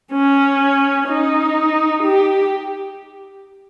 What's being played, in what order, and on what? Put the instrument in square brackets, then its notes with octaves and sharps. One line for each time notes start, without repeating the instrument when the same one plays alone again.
[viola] C#4
D#4
G4